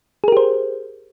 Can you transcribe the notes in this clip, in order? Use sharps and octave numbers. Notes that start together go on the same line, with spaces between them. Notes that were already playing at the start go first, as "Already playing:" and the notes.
G4 G#4 A#4 C5